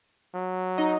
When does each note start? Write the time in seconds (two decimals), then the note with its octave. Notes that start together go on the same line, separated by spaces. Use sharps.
0.34 F#3
0.78 D#4 D#5